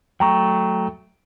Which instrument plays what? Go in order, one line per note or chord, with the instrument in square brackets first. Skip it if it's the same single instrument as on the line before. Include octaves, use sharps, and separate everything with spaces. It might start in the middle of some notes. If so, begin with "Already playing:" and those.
[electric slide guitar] F#3 A3 [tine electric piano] G5 A#5 C#6